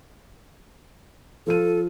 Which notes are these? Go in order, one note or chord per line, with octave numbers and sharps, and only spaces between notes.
F3 F4 A4 D#7